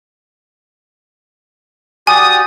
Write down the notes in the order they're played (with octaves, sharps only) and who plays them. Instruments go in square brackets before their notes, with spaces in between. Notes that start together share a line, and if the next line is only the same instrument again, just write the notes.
[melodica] F#4 G4 D5 [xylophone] G#5 [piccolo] D#6